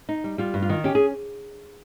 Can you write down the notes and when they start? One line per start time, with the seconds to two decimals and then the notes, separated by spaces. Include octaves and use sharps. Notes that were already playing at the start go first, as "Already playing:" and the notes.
0.09 D#4
0.24 G3
0.38 G3 F4
0.54 G2
0.62 F4
0.69 D#3
0.84 C#4 G4
0.95 G#4